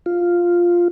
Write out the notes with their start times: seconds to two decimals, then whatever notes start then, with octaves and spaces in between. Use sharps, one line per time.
0.06 F4